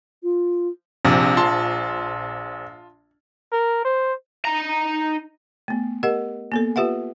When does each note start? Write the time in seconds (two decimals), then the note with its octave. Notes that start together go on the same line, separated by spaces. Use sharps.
0.23 F4
1.05 A#1 C3 F3
1.37 F4 A5 C6
3.52 A#4
3.85 C5
4.45 D#4 A#5
5.68 A3 B3
6.03 G4 A#4 D#5 F#5
6.52 A#3 B3 A4
6.76 F4 G4 B4 E5 F#5